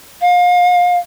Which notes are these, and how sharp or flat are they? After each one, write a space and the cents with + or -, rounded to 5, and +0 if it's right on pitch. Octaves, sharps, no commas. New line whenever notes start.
F5 +30